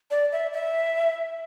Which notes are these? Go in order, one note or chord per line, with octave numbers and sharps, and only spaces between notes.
D5
E5
E5